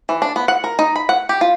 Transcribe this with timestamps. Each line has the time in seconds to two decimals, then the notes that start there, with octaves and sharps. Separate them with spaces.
0.09 E3
0.22 D4
0.36 B3
0.48 F#5
0.64 A#4
0.79 D#4
0.96 B5
1.09 F#5
1.29 G4
1.41 F4